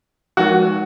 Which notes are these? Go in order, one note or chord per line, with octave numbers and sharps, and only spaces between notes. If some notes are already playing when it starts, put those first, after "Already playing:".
F3 G#3 D#4 F#4 A#4